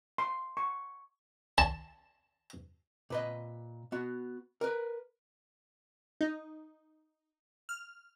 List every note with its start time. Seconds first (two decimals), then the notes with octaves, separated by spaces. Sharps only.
0.18 C6
0.57 C#6
1.58 A5
3.10 A#2 B4 D#5
3.92 B3 F#4
4.61 A#4 B4
6.21 D#4
7.69 F6